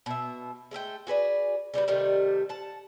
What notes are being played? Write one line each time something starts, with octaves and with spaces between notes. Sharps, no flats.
B2 E5
G#3 A3 E5 G5
F#4 G#4 B4 D5
C#3 G3 F#4 B4
C3 D#3 G3 A3
F#5 A5